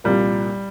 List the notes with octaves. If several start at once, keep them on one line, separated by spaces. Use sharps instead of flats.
C2 A#2 F3 G3 A#3